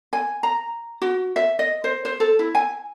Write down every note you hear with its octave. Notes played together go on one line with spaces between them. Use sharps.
G#5
A#5
F#4
E5
D#5
C5
C5
A4
E4
G#5